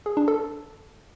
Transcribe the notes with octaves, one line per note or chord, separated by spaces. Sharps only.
G#4
D4
A4